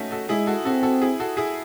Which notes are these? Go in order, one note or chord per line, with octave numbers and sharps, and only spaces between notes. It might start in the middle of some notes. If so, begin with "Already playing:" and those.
Already playing: A3 C#4 D#4 F#4
F#4 A4
G#3 E4 G#4
F#4 A4
C4 F#4 A4
F#4 A4
E4 G#4
F#4 A4
E4 G#4